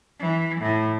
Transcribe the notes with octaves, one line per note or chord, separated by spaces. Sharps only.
E3
A2